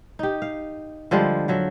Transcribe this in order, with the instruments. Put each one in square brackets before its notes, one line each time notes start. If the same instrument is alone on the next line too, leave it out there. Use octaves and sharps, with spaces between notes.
[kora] D#4 G4
F5
D3 F3 G3 G#3
F3 F#3 E5